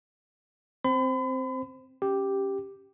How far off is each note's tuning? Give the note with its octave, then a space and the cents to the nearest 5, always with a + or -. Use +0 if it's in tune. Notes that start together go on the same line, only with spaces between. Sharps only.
C4 +0 C5 +0 B5 +40
C#4 +0 G4 +0